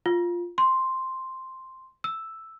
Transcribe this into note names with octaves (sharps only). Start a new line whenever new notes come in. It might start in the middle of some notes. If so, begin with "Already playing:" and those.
F4
C6
E6